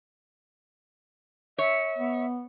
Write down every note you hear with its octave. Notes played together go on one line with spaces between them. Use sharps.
C#5 E5
B3